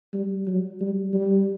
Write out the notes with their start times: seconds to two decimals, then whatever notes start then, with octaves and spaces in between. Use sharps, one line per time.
0.14 G3
0.48 F#3
0.81 G3
1.14 G3